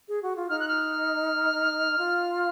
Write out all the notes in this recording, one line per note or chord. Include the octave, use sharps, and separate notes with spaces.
G#4
F#4
F4
D#4 F6
F#6
F6
F4